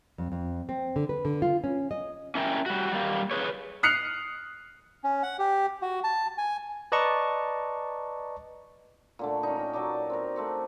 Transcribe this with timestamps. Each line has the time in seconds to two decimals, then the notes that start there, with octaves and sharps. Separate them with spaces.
0.18 F2
0.32 F2
0.69 C4
0.96 D3
1.09 B4
1.25 D3
1.42 F4
1.64 C#4
1.91 D#5
2.35 C#4 E4 A#4 G5
2.66 G3 F#4
2.92 G3 A#3
3.31 G#4 B4 C#5
3.83 D#6 F6 F#6 C7 C#7 F7
5.04 C#4
5.23 F#5
5.39 G4
5.82 F#4
6.04 A5
6.38 G#5
6.92 B4 D5 D#5 A5 A#5 C#6
9.19 A#2 D3 A3
9.43 C#4 D#4
9.56 A#4 G5
9.73 F#3 D4 D#4 D5
10.10 C4 A#4
10.36 A3 C4 F#5